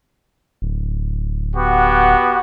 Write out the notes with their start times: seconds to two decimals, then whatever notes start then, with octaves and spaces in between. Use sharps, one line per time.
0.62 D1
1.56 B3 F#4 G4